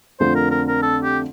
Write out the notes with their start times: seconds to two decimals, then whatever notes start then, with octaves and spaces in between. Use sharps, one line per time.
0.20 F2 D3 A3 C4 F4 C5
0.35 A#4
0.51 A#4
0.68 A#4
0.82 A4
1.04 G4